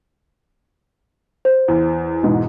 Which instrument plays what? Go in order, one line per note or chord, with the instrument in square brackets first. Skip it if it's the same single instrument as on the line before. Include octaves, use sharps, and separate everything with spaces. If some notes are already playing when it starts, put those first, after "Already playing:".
[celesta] C5
[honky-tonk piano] E2
E2 G#2 B2